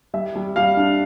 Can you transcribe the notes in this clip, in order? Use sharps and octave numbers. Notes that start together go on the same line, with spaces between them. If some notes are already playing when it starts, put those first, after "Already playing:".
G3 E5
G3
G3 F5
D4